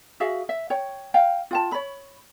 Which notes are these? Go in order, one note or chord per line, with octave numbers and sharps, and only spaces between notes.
F#4 G#4 E5 F5
E5
C#5 G5
F5 G5
F4 G5 A5
C#5 B5